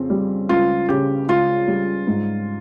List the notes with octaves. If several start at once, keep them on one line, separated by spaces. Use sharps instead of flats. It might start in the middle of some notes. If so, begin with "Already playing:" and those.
Already playing: F2 C#3 C4
G3
C#2 F4
C#3 G4
C#2 F4
G3
G#2